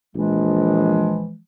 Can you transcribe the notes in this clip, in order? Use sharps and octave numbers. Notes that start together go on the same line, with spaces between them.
A#1 E3 F3 G#3